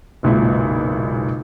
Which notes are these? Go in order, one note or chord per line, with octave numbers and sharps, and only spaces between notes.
F#1 B1 A#2 G#3 E4